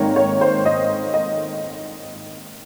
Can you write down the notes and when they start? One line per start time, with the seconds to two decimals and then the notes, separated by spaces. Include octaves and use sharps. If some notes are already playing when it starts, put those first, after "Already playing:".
Already playing: G#1 G#2 D#3 A#3 C#5 A#5
0.16 C#5
0.41 C5
0.65 D#5
1.14 D#5